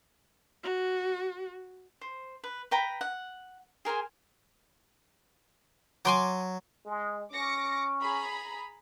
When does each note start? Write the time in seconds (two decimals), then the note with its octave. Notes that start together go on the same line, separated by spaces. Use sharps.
0.63 F#4
2.01 C5
2.44 B4
2.71 B4 G5 A#5 B5
3.01 F#5
3.85 G#4 A#4 C5 G#5
6.05 F#3 G#5 C6 D6
6.86 G#3
7.32 C#4 D6 A#6 C#7
8.03 G#4 A#5 B5